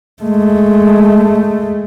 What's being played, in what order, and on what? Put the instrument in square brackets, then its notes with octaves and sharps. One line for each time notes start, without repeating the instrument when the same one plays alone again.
[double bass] G#3 A3